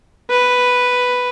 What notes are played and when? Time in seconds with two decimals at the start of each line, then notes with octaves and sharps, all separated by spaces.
0.30 B4